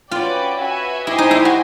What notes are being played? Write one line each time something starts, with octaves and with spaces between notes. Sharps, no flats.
C#4 F4 F#4 B4 D5 G5
F#4 B4 E5 G#5
E4 G4 C5 D#5 G#5
D#4
E4
F#4